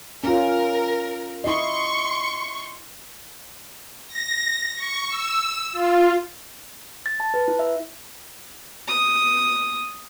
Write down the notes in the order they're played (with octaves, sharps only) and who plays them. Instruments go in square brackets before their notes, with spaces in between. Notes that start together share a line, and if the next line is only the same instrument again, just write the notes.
[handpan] C#4 F4 [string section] A#4
[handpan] E4 D#5 [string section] C6 C#6
[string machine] A#6
C#6
E6
F4
[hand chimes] A6
A5
B4
E4
E5
[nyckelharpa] D#6